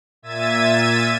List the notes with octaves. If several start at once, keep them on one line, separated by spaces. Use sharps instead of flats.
A#2 E5 E6 G#6 A6 D#7